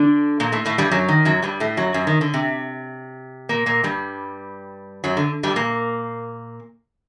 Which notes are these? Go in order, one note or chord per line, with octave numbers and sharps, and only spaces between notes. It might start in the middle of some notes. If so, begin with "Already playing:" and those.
Already playing: D3 D4
A#2 A#3
A2 A3
A2 A3
G2 G3
F#2 F#3
D#3
F#2 F#3
G2 G3
A2 A3
F#2 F#3
F#2 F#3
D#3
D3
C3
A#2 A#3
A#2 A#3
G2 G3
F#2 F#3
D3
G2 G3
A#2 A#3